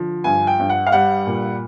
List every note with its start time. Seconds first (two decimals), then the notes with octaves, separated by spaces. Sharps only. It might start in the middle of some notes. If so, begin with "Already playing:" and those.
Already playing: D3 F3
0.24 G2 G#5
0.47 G5
0.59 G2
0.70 F#5
0.87 F5
0.92 G3 F#5
1.27 A#2